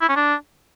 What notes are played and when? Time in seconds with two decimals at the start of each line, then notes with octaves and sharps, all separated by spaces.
0.02 E4
0.09 C#4
0.16 D4